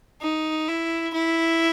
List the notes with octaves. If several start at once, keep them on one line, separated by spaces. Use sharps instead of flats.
D#4
E4
E4